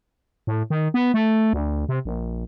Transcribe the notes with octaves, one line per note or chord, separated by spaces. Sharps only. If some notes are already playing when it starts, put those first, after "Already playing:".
A2
D#3
B3
A3
D2
C3
A#1